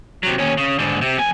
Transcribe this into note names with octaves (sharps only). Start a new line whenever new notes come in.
C3 F#3
D#2 C#4
C#3
G#2 D3
C3
F2 G#5